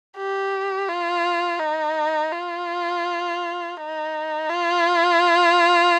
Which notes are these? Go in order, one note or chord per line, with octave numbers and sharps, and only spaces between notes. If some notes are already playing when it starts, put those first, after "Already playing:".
G4
F4
D#4
F4
D#4
F4